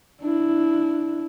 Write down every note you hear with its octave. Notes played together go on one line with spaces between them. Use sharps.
D4 E4